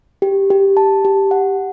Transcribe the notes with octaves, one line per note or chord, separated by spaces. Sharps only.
G4
G4
A5
G4
F#5